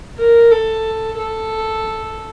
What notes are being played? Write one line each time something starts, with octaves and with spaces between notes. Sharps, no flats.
A#4
A4
A4